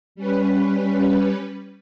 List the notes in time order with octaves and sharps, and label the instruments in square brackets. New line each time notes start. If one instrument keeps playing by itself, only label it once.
[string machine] G3 C#4 B4